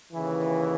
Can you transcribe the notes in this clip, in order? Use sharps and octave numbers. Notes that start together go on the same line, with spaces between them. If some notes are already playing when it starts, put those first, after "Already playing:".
D#2 C#3 E3